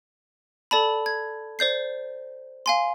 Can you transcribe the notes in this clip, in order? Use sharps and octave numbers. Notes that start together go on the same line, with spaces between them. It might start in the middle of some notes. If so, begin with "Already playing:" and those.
A4 D5 A5 B5
G#6
C5 D5 G6 C7
F5 G#5 C6